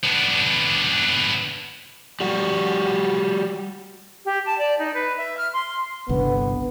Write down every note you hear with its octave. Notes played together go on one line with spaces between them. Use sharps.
B3 D4
G3 F#4
G4
A5
D5
D#4
B4
E5
F6
C6
G1 C2 D3 B3